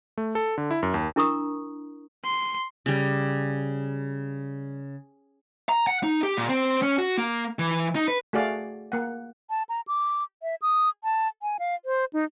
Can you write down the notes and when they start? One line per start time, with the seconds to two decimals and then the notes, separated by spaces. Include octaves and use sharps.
0.17 A3
0.35 A4
0.58 D3
0.71 E4
0.83 F#2
0.94 D#2
1.16 D4 E4 A#4 A#5 C#6 D#6
2.24 C6
2.86 C#3 G3
5.69 A#5
5.87 F#5
6.03 D#4
6.23 G4
6.37 A#2
6.49 C4
6.82 C#4
6.98 F#4
7.18 A#3
7.59 E3
7.95 D#4
8.08 B4
8.33 A3 F#4 G#4 D5 F5
8.92 A#3 F#5
9.50 A5
9.69 A#5
9.88 D6
10.43 E5
10.62 D#6
11.04 A5
11.42 G#5
11.59 F5
11.85 C5
12.13 D#4